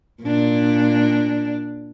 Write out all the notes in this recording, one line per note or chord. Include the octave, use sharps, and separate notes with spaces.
A#2 D4